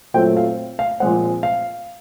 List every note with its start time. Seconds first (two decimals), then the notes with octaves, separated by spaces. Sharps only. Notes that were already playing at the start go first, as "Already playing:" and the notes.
0.14 A#2 F#3 A3 C4 G5
0.37 F5
0.79 F5
1.00 A#2 F3 G#3 C4 F#5
1.43 F5